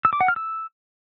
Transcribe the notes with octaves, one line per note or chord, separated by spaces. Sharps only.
E6
D6
F#5
F6
E6